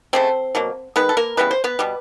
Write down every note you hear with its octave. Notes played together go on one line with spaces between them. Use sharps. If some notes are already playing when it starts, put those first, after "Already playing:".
C#3 F#3 A3 C4 C5
B2 F#3 A#3
D#3 G#3 B3 B4
A4
A#3 A#4
C#3 E3 G3 B3 B4
C5
B3 B4
B2 G3 B3